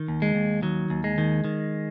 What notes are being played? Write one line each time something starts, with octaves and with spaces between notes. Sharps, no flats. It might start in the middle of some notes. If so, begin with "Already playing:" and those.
Already playing: D#3
D#2
G#3
D#2
D#3 F#3
D#2
G#3
D#3
D#3